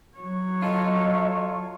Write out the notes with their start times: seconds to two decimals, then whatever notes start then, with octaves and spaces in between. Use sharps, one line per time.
0.17 F#3 C#5
0.62 F4 A4 D#5